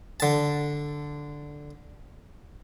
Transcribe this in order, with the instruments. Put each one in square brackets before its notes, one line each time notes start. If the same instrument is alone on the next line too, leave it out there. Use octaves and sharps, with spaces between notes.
[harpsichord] D3 A5